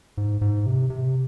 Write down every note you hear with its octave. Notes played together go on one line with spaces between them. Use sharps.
G#2
G#2
C3
C3